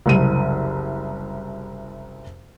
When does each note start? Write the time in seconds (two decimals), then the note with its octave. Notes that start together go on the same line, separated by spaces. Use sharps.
0.06 F#1 C2 D#7